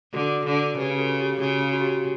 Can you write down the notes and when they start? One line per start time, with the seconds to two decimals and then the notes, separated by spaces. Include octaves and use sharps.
0.13 D3 F#4 A4
0.46 D3
0.77 C#3 G4 B4
0.98 F#4 A4
1.20 G4
1.41 C#3 F#4
1.73 F#4
1.81 G4
1.89 F#4